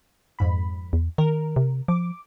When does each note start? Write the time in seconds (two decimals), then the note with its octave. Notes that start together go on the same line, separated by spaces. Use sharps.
0.39 F2 G#2 B5
0.93 E2
1.18 D#3 A#4
1.56 C3
1.88 F3 D6